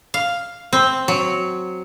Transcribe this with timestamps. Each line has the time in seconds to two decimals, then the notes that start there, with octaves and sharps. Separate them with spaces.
0.14 F5
0.73 C4
1.08 F#3